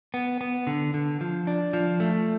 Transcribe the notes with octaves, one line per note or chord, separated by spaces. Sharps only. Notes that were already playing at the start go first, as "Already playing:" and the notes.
B3
B3
D3
D3
F3
D4
F3
A3